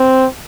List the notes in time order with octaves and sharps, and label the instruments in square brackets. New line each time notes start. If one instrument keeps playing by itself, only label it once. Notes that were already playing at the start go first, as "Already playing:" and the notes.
Already playing: [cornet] C4